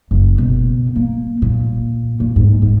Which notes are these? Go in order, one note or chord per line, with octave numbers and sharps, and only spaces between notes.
F#1
B2
A#3
A#2
A#2
G#2
G#2